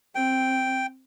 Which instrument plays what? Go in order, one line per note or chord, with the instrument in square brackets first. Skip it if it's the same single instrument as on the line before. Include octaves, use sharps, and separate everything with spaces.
[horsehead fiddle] C4 [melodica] G5